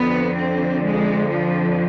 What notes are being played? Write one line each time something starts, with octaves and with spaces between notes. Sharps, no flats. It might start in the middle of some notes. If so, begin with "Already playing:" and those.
Already playing: F2 D3 B3
C4
G#3
F3